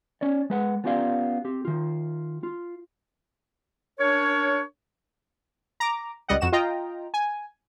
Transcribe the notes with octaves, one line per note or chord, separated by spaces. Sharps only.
C#4 C#5 D5
G#3 B4 F#5
B3 C#4 F4 G4 D5 F5
C4 G4
D#3 F4
F4
C#4 D4 A#4 C#5
A#5 D6
C#2 G3 D#5 F#5
F2 F#4 E7
F4 D#5 G5 A#5
G#5